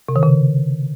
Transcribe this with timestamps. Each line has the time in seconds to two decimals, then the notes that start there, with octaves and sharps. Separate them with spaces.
0.09 C3
0.16 D#3
0.23 C#3